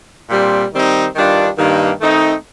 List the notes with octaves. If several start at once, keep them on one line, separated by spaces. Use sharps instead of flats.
A#2 G3 C4
D#3 G3 C4 D#4
G2 D#3 G3 D4 F4
G2 D#3 A#3
D#3 A3 C4 D#4